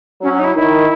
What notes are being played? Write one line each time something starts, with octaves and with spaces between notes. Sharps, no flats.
F#3 C#4
C#4
D#4
E4
D#3 E4